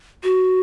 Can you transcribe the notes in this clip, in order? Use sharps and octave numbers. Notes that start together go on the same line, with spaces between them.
F#4